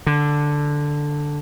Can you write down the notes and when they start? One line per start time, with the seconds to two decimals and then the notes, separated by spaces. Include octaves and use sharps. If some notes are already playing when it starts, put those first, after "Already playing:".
0.07 D3